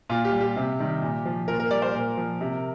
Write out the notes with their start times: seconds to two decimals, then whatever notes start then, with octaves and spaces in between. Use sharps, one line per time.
0.09 A#2 F4
0.25 G4
0.32 G3
0.41 G4
0.57 C3
0.80 D#3 G3
1.02 A#2
1.26 F3
1.48 A#2 A#4
1.60 A#4
1.71 G3 D5
1.82 C5
1.94 A#2 A#4
2.18 F3
2.41 C3